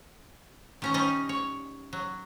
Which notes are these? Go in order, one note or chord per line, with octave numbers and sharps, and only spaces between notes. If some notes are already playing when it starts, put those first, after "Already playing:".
D#3 C#4 A#5
G3 C#4 D#4 D#5
C#5
F#3